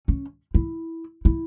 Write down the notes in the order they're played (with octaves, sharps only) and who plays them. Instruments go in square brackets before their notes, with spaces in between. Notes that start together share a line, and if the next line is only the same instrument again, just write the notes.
[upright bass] C#4
E4
E4